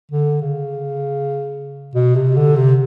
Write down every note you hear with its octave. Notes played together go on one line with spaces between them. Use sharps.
D3
C#3
B2
C3
D3
C3